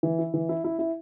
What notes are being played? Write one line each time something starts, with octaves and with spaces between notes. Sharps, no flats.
E3
E4
E3
E4
E4
E4